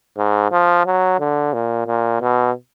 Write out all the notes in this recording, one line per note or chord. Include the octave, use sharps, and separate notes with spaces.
G#2
F3
F#3
D3
A#2
A#2
B2